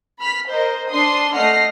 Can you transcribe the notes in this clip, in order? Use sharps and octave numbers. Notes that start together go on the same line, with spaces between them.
B5 F6 B6
A#4 C5 D#5
D4 C6 D#6 C7
A3 D#5 F#5 F6 A#6 C7